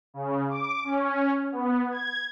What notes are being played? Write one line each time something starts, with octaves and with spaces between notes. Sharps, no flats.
C#3
D6
C#4
B3
G#6